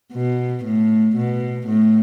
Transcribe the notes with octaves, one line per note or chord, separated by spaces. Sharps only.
B2
A2
B2
A2